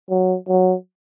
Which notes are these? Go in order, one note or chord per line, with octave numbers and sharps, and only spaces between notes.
F#3
F#3